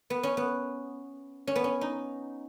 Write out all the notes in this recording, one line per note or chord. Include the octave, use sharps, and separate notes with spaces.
B3
C#4
B3
C#4
B3
C#4
D#4